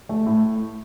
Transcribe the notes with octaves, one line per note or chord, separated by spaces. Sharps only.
A3
A2